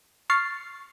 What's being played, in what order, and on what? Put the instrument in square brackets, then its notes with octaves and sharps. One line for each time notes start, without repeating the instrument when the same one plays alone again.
[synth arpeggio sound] C#6 F6 A6 C7